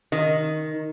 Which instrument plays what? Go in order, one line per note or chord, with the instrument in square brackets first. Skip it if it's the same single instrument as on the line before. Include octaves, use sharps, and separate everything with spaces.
[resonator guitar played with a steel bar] D#3